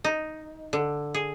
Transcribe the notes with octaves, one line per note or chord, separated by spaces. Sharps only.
D#4
D3
G#4